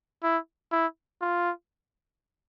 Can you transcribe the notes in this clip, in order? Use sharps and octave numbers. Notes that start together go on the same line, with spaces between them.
E4
E4
F4